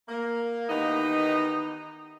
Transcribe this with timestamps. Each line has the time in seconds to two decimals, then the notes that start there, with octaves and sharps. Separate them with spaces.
0.09 A#3
0.69 D#3 E3 B3 D#4 G4 D#5